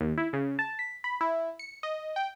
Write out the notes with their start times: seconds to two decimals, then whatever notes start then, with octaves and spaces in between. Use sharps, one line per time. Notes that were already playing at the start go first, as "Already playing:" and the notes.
0.01 D#2
0.18 E4
0.33 C#3
0.59 A5
0.79 B6
1.04 B5
1.21 E4
1.59 C#7
1.83 D#5
2.16 G5